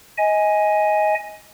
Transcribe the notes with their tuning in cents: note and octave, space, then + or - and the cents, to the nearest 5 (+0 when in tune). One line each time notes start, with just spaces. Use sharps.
D#5 +20 G#5 +0